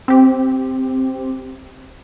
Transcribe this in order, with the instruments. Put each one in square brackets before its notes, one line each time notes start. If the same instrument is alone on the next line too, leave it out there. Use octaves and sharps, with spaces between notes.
[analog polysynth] C4 G4